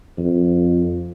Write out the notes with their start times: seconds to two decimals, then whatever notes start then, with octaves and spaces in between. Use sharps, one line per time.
0.18 F2